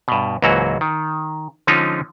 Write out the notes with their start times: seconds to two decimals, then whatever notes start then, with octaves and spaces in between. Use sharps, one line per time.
0.08 G2 B2
0.42 C#2 G#2 E3 F#3 A#3 F#4
0.81 D#3
1.67 D3 F3 G#3 C#4 D#4 F4